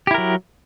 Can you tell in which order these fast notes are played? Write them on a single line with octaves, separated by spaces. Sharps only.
G4 E4 A#4 F#3